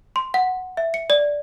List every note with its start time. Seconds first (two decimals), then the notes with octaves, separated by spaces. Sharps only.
0.16 C6
0.34 F#5
0.77 E5
0.94 C#7
1.10 D5